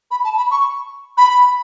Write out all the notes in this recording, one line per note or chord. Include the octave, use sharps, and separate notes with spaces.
B5
A5
B5
C#6
B5